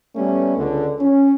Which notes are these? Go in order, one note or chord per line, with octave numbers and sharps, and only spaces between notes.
G3 A3 B3 C#4
C#2 D3
C#4